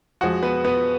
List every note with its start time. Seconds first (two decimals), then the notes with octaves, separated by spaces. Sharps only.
0.21 F2 F3 G#3 F#4 F#5
0.43 B3 B4
0.65 B3 B4